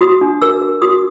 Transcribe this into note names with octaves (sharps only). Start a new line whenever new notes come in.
F#4 D#6
D4
A#4 E6
A#4
F#4 D#6